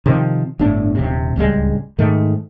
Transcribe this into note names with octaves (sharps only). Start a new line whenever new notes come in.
C3 D#3 F3
G1 A2 D4
D#1 C3
D1 C#2 G3 G#3
G#2 D#3 A3